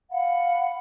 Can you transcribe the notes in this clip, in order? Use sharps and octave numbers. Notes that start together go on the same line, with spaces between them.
F5 F#5 B5